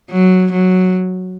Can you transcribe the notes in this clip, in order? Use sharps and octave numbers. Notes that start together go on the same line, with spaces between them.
F#3
F#3